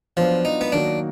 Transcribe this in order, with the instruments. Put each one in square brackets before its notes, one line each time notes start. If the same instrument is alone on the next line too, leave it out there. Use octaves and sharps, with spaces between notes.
[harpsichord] F3 [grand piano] F#3 B3 D4 F4
[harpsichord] D#4
B3
[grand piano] D#3 F#3 A#3 D#4 F#4 [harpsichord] D4